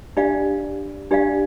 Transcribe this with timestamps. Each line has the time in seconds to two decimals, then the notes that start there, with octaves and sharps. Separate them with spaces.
0.17 D4 G4 D5 F5
1.11 D4 G4 D5 F5